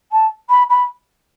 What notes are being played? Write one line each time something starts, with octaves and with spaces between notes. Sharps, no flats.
A5
B5
B5